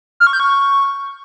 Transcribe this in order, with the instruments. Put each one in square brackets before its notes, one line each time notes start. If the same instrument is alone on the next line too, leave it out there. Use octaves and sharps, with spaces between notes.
[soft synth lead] F6
C#6
G6
C#6